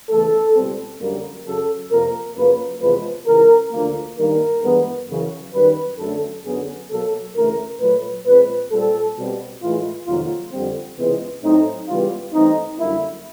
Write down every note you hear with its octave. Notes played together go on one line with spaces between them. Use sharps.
E2 C#3 E3 A3 A4
C#2 B2 G3 C4
F#2 D3 G3 A#3
F#2 C#3 F#3 A4
F2 C3 F3 A#3 A#4
F#2 C#3 F3 A#3 B4
E2 C3 F3 G#3 B4
C#2 C#3 E3 A#4
D2 D3 F3 A#3
G2 D#3 G3 A#3 A#4
G2 E3 G#3 B3
F#2 C#3 E3
F#2 D#3 G3 B4
F#2 D3 F#3 A3 A4
F#2 D3 F#3 B3 G#4
B2 F#3 A#3 A4
D2 C#3 E3 A3 A#4
A#2 F#3 A3 B4
A#2 F3 G#3 C4 B4
A#2 G3 C4 A4
B2 G3 C4
A2 E3 G#3 F4
F2 C3 D#3 F#3 A#3 F4
F2 D3 G3 C4
C#2 C3 E3 G#3 B3
A2 F#3 A3 C4 D#4
C#2 C#3 E3 G3 B3 F4
G2 E3 A3 C4 D#4
F#2 D3 G3 A#3 E4